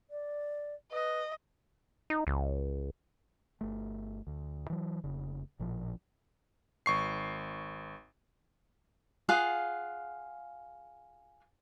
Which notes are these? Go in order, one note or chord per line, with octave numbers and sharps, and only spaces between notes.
D5
B4 D#5
D#4
C#2
G1 A3
D2
E3 F#3
F1 C#3
A1 A#2 F3
G#1 C#6 C7
F4 G#4 F5 F#5